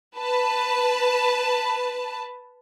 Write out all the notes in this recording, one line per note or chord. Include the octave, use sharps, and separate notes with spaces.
B4 A5